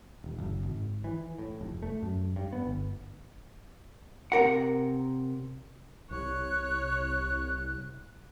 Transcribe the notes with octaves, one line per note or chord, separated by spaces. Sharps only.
D#1
F#1
G#1
E3
A2
F1
A3
F#2
G2
B3
G1
C3 A#4 F#5
C2 C#5 F#6